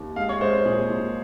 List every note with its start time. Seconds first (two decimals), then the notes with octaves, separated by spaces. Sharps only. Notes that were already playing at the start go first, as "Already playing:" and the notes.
Already playing: D#2
0.16 G#3 F5
0.29 C#5
0.41 G#3 C5
0.53 C5
0.65 A#2 G#4
0.90 A#2